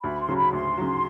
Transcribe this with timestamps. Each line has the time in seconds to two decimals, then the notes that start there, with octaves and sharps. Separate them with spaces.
0.04 D2 B5
0.20 C6
0.29 C#3 F#3
0.36 B5
0.53 D2 C6
0.78 C#3 F#3